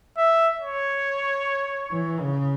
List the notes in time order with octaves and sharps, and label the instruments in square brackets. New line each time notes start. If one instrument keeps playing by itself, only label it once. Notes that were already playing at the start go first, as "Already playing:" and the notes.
[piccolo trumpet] E5
C#5
[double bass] E3
C#3